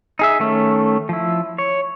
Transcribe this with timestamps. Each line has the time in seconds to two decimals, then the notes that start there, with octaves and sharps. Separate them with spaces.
0.19 D#4 G#4 E5
0.40 D#3 A3 C#4
1.09 F3 E4
1.58 C#5